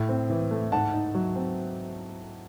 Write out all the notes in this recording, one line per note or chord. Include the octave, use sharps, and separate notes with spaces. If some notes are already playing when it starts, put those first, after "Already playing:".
Already playing: A2
C4
E3
A3
G#2 F#5 A5
D#4
F#3
C4